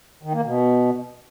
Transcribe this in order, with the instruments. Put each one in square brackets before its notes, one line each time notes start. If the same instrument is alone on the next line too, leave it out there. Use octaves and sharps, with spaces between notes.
[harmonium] D#3
A#3
B2